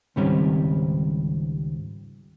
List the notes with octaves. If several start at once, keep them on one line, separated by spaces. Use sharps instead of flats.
C#2 G#2 D#3 G3 C4 C#4